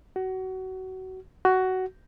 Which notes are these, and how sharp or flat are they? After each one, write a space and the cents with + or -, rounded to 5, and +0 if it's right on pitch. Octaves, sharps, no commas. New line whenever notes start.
F#4 +25
F#4 +15